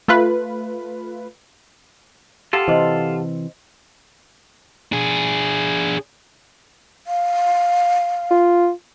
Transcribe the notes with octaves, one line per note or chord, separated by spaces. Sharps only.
A3 F4 B4
F4 G4 A4 F#5 A5
C3 E3 C5 D#5 C6
D4 G#4
F5
F4